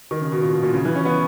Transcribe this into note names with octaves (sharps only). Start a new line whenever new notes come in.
D#3
C#3
B2
A#2
B2
A#2
C#3
E3
C#4
B3